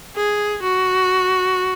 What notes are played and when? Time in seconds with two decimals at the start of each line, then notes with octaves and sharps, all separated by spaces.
0.16 G#4
0.62 F#4